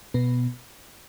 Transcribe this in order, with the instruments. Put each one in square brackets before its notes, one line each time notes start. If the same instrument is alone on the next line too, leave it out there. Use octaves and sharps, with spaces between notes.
[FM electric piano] B2 B3